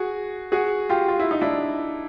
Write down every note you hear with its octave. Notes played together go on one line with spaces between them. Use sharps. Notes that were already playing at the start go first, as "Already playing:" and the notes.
Already playing: F#4 G#4
F#4 G#4
F4 G4
F4
E4
D#4
D4 E4